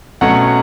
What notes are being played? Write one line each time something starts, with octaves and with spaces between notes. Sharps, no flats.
B2 F#3 A3 C#4 F#5